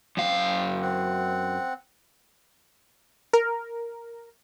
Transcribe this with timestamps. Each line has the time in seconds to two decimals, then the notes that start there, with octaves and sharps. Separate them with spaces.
0.17 F#2 C4 F5
0.39 G5
0.82 C4 F#5
3.33 A#4